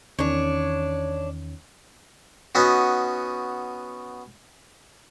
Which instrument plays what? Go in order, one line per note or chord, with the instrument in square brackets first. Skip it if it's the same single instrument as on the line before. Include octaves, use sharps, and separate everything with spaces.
[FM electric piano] E2 D#3 C#4 [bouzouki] D4 C#5
[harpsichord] B3 C#4 D#4 F#4